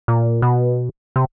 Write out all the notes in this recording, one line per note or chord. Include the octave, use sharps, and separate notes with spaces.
A#2
B2
C3